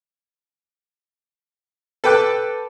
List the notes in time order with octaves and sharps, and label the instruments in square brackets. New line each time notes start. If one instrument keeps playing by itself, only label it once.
[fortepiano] A4 B4 G5 D6 F#6